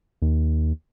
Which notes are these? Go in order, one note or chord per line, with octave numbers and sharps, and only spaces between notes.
D#2